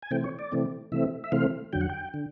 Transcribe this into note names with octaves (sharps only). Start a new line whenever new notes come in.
G#5
C3 E3 A3 C4 G5
C#5
D5
C3 E3 A3 C4
C3 E3 A3 C4 E5
E5
C3 E3 A3 C4 F5
F2 D3 F#3 G5
F#5
G5
D3